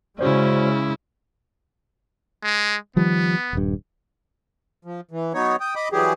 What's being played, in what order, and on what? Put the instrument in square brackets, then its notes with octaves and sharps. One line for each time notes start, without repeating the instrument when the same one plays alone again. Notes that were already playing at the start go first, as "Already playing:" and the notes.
[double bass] C#3 G#3 [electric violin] C#4 E4 [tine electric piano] F#4 C5 D5
[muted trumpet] G#3
[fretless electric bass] D#3 F3 G3 [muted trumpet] B3
[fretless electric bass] D#1 G2
[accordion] F3
E3
F#3 B3 D#4 C#5
G5 D#6
D#5 B5 D6 D#6
E3 F#3 G3 G4 G#4